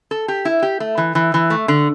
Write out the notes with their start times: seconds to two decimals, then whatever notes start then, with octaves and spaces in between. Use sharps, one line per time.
0.11 A4
0.28 G4
0.45 E4
0.62 G4
0.80 A3
0.98 E3
1.15 E3
1.34 E3
1.50 A3
1.68 D3